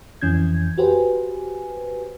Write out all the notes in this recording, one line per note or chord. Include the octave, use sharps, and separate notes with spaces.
F2 E3 C#4 G6 G#6
F#4 G4 B4 C5 G#5